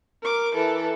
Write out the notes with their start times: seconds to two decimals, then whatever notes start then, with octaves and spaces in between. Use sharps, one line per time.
0.22 A#4 D6
0.55 E3 A4